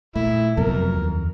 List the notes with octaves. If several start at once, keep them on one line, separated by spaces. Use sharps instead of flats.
A#2 A3 E4
F2 C3 F#3 B3 A#4
D#2